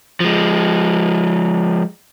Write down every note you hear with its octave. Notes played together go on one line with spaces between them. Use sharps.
F3 G#3